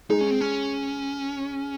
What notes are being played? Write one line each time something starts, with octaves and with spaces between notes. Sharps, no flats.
G#3 D#4
C#4
C4
C#4